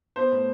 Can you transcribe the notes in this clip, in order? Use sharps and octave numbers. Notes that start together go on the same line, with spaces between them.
B3 C5
A2